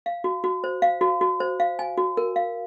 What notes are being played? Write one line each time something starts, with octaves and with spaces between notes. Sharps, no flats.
F5
F#4
F#4
C5
F5
F#4
F#4
C5
F5
G#5
F#4
A#4
F5